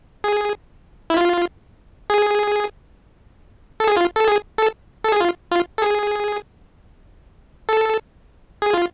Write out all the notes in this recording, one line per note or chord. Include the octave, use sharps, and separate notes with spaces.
G#4
E4
F4
G#4
A4
G#4
F4
A4
G#4
A4
A4
G#4
F4
F4
A4
G#4
A4
G#4
F4